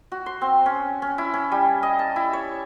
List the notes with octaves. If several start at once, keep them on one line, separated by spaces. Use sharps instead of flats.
F#4
C6
C4
C#4
C#4
E4
C#4
G3
D#5
A5
E4
C#5